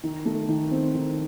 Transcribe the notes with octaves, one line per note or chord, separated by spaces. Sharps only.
D#3
A3
D#3
C4
D#3